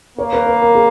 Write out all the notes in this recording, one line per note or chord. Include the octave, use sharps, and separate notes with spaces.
A#3 C#5
B4
B4
A#4
G#4